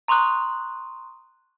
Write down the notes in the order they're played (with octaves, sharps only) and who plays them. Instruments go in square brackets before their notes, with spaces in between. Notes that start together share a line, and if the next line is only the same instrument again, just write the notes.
[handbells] A#5 C6 C#6 D#6 F#6